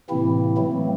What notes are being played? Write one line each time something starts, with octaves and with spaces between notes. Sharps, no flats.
A2 C3 E3 A#3 C4 E4
E3 F#3 A3 A#3 C4